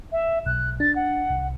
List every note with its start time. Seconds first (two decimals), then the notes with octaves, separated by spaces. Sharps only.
0.12 E5
0.46 B1 F#6
0.80 D4 A6
0.96 F#5
1.30 C2